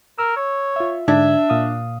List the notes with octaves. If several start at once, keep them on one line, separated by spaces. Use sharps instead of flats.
A#4 E6
C#5
F4 E5
G#2 D3 D4 E5 G#6
A#2 F5 D#6